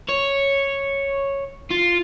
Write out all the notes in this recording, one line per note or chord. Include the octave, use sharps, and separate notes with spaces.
C#5
F4